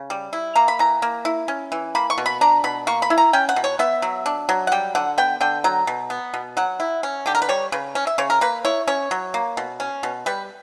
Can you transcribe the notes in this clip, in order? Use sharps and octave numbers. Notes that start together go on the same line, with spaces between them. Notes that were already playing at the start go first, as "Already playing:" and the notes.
Already playing: C#3
G3
E4
A#3 A#5
B5
E3 A#5
A#3
E4
C#4
E3
A#3 B5
C#6
B2
B5
D4 A#5
B2 B5
A#3 C#6
B5
E4
A#5
C#4 G5
F#5
B2
C#5
B3 E5
F#3
D4
F#3
F#5
G3 G5
D3 F#5
B3 G5
D3 G5
F#3 A#5
B2
B3
B2
F#3 F#5
E4
C#4
D3 G4
A#4
B4
G3 C#5
C#3 B4
C#4
E5
C#3 C#5
A#4
A#3 B4
E4 C#5
C#4 C#5
F#3
A#3
B2
C#4
B2
G3 B4